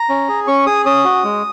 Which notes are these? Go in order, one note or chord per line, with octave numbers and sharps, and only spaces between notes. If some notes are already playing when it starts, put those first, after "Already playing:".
Already playing: A#5
C#4
G#4
C#4 C#6
G#4 D#6
C#4 D#6
F#4
G#3